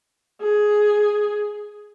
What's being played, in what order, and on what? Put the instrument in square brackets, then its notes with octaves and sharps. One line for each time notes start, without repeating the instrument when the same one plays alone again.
[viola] G#4